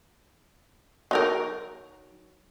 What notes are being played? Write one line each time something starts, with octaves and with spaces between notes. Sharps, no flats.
F#3 D#4 A#4